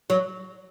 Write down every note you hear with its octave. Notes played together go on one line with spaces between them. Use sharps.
F#3